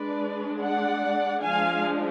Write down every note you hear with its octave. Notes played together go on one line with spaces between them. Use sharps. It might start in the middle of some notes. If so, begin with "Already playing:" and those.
Already playing: G#3 D4 B4 D5
D5 F#5
F3 G#3 D4 F5 G#5